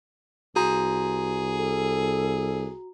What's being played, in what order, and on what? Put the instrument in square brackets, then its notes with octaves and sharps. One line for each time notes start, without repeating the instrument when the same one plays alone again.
[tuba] C2 [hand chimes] F#4 A#5 [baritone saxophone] G#4
[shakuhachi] A4